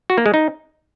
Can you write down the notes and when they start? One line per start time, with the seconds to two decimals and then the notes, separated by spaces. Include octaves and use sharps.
0.10 F#4
0.18 A#3
0.26 G#3
0.34 D#4